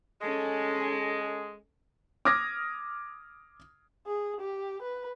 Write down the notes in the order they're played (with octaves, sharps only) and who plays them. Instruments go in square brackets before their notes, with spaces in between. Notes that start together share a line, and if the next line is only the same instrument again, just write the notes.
[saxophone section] G#3 [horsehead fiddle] C#4 A4
[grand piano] D6 D#6 F6 G#6 A#6
[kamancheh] G#4
G4
B4